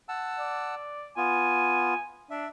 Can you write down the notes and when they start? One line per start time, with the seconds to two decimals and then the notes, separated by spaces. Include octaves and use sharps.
0.09 F#5 A5 E6
0.39 D5
1.17 B3 F4 G#5
2.30 D4 E5